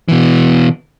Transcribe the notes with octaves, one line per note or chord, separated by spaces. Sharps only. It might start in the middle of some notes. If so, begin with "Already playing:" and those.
B2 E3